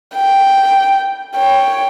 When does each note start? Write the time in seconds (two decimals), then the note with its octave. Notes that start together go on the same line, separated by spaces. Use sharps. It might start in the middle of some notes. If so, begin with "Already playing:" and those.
0.15 G5
1.36 C#5 G5